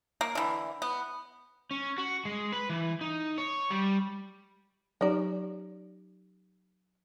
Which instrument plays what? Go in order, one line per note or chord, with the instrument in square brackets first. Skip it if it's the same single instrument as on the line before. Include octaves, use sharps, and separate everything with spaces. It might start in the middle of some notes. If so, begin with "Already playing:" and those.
[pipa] A#3
D3 E3
B3
[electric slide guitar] C#4
F#4
G#3
B4
E3
D#4
C#5
G3
[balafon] F#3 D#4 G4 [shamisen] C#4 D5